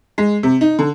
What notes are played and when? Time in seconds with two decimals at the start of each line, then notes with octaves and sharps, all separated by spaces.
0.18 G#3
0.43 C3
0.61 D#4
0.79 D3